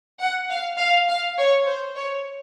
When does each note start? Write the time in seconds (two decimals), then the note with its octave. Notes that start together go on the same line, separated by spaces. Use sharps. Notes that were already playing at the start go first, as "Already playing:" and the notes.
0.20 F#5
0.50 F5
0.79 F5
1.08 F5
1.38 C#5
1.67 C5
1.96 C#5